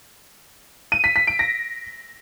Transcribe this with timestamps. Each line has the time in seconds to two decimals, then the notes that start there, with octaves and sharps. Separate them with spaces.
0.92 D#7
1.04 B6
1.16 B6
1.27 D7
1.39 A#6